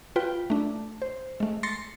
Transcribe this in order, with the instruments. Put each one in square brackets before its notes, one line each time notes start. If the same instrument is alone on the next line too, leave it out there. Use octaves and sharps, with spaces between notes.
[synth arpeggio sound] F4 B4 G5
A3 D4
C5
G#3 A3
C6 A6 A#6 C7 C#7